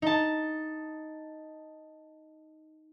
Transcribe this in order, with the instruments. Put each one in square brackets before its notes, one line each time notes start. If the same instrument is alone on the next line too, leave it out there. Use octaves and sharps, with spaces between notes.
[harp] D#4 A5